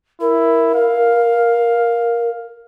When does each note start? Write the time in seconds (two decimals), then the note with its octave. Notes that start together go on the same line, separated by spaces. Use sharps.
0.21 E4 A#4
0.74 F5